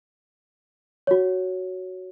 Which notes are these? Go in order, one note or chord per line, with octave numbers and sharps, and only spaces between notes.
F#4 C#5